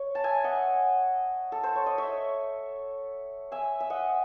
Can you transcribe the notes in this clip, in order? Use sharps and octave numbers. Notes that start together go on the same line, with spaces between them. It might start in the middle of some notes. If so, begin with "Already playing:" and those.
Already playing: C#5
A5
E5 G#5
D#5 F#5
A4
C5
C#5
D#5
C#5 E5
E5 G#5
E5
D#5 F#5